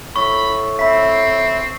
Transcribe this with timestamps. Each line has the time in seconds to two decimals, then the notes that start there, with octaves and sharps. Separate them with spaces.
0.16 A2 B5 C#6
0.79 C4 E5 B5 B6